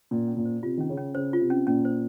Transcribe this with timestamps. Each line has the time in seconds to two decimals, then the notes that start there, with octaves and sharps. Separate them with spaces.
0.11 A#2 C#4
0.28 C#4
0.37 A#2
0.45 C5
0.63 C3 F4
0.77 D#3 C#4
0.89 C#3
0.98 C#4
1.15 C#3 C5
1.33 F4
1.41 C3
1.50 C#4
1.67 A#2 C#4
1.85 C5